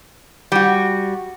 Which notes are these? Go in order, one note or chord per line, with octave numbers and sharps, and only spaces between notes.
G3 F#4